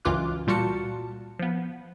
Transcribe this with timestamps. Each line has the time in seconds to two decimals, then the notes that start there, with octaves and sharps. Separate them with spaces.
0.05 C#2 F#2 E3 F4 D6 F#6
0.47 A#2 G3 F4 F#4 A5 C#7
1.39 F3 B3